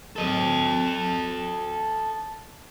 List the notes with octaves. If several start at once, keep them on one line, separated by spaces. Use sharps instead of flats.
A4 D#5